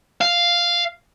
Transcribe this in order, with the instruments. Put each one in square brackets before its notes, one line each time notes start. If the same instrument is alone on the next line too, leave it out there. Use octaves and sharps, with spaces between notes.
[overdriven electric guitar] F5